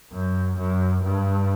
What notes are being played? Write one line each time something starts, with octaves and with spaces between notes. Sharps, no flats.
F#2
F#2
G2